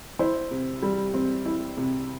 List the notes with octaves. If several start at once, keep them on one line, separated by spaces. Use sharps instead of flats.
E4 C5
C3
G3
C4
E4
C3